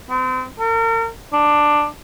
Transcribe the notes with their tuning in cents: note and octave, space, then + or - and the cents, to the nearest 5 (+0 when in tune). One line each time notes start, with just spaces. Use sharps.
C4 -35
A#4 -40
D4 +10